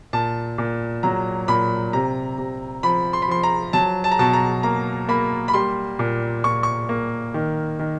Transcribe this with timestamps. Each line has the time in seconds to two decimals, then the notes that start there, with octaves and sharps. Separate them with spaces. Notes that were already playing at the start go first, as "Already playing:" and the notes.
0.13 A#2 A5
0.58 A#2
1.03 F#3 A#5
1.48 A#2 B5
1.93 C3 A#5
2.38 C3
2.83 F3 B5
3.13 C6
3.22 B5
3.28 F3 C6
3.43 A#5
3.73 F#3 A5
4.04 A5
4.11 A#5
4.19 B2 A5
4.33 A#5
4.63 A#3 A#5
5.09 A#3 B5
5.48 B5
5.53 G3 C6
5.99 A#2
6.44 A#2 C#6
6.63 C#6
6.89 A#3
7.34 D#3
7.79 D#3